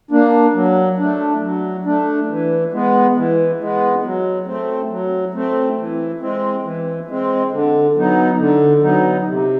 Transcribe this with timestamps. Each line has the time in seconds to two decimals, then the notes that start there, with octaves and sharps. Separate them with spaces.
0.11 A#3 D4
0.54 F#3
0.98 A3 D4
1.42 F#3
1.85 A3 D4
2.29 E3
2.72 G#3 B3
3.16 E3
3.60 G#3 B3
4.04 F#3
4.46 A3 C4
4.90 F#3
5.34 A3 C4
5.77 E3
6.21 G#3 C4
6.64 E3
7.08 G#3 C4
7.52 D3
7.96 F#3 B3 D#4
8.38 D3
8.82 F#3 B3 D#4
9.26 C3